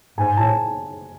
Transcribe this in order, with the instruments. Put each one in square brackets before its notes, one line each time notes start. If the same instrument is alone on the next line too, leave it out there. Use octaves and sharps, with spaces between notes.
[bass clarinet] G#2 [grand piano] G#5
[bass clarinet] A2 [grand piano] A5